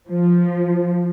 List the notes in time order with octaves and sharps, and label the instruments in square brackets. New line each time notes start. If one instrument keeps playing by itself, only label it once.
[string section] F3